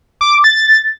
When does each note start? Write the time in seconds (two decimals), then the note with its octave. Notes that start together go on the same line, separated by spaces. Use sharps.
0.21 D6
0.44 A6